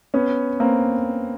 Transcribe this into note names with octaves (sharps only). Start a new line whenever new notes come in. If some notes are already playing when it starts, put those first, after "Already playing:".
B3 C#4
A#3 C4